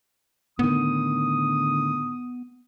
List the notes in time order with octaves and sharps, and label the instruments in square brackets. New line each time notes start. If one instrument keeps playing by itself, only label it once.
[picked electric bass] A2 D#3 [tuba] D3 [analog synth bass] B3 [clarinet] D#6